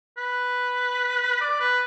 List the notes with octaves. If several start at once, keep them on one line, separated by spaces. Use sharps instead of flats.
B4
D5
B4